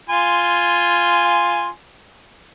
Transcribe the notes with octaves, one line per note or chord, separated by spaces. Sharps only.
F4 G#5 C6